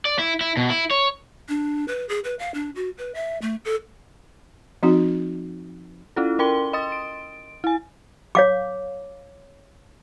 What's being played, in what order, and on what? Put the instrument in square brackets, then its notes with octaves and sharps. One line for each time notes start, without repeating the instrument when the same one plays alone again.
[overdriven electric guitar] D5
E4
E4
B2
E4
C#5
[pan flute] D4
B4
G#4
B4
F5
D4
F#4
B4
E5
A3
A4
[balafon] F3 C4 D#4 F#4
[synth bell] C#4 E4 F4 A4
C#4 A#4 G5 C6 G7
D#5 C6 D#6 A6
D7
E4 G#5
[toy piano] C#5 F5 D6